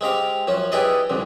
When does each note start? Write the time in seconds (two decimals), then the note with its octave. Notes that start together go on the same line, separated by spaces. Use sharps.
0.01 G#3 C4 G4 F5
0.47 F#2 F3 C#4
0.72 E4 G4 G#4 B4 D5 D#5
1.10 C2 F2 D3